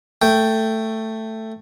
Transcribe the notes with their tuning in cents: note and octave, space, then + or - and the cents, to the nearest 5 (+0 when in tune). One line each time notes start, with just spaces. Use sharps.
A3 +10 G5 -5